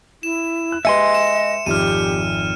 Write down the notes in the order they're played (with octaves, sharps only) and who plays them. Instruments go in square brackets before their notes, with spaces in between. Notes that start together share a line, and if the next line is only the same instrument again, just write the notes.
[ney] E4 [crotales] E7
[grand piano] F#6
[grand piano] G#3 G4 B4 [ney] D#5 [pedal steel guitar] E5 G#5 C6 [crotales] C#7
[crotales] E7
[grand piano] G#1 F2 [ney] G4 [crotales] F6 D#7